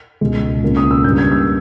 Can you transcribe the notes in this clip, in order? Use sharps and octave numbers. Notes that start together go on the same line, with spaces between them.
C#2 B2 G#3
C#2 B2 A#3 C#4
D#6
E6
G2 G3 A#3 C#4 G6
G#6
E6